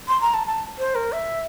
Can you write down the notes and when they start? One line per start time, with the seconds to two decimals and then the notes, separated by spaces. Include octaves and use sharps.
0.08 C6
0.21 A#5
0.34 A5
0.47 A5
0.78 C5
0.95 A#4
1.12 E5